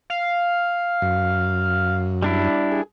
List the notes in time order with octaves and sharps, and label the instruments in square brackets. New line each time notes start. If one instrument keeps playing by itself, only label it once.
[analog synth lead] F5
[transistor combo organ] F#2
[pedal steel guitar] G3 D4 E4
[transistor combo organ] G#4